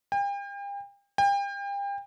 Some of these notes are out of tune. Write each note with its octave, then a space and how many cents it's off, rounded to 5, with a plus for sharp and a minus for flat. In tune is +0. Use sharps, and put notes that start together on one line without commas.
G5 +40
G5 +35